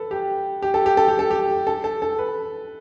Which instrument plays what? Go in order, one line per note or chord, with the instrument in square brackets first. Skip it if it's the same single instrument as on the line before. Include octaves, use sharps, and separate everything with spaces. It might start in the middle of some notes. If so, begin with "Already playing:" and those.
Already playing: [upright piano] A4 B4
G4
G4
A4
G4
A4
G4
A4
G4
A4
A4
A4
B4